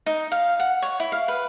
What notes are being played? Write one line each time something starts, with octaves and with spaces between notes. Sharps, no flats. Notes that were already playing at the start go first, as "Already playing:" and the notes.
D#4
F5
F#5
C#5
E4
F5
B4